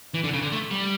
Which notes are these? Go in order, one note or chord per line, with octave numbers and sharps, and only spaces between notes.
E3
D3
C#3
D3
A3
G3